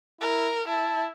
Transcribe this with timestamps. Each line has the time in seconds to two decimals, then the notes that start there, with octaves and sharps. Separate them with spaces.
0.21 E4 A#4
0.68 E4 A5